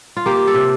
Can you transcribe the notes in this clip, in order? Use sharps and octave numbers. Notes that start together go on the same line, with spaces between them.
F4
A#3 G4
A4
C3